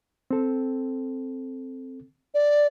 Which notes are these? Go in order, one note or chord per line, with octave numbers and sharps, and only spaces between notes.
C4 A4
D5